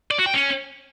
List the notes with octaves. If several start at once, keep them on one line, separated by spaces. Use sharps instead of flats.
D5
F#4
G5
C#4